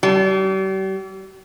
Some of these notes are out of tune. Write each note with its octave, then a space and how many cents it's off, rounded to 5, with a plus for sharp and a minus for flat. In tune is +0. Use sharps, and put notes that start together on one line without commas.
G3 -40